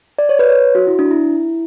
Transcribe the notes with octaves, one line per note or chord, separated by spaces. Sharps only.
D5
C#5
B4
C#5
F#4
E4
D4
E4